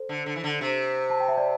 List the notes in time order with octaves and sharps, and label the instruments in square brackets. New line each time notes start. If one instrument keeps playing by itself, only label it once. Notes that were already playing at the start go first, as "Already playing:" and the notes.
Already playing: [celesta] A4 C5
[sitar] D3
D3
E3
D3
C3
[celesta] A5
G5
E5
D5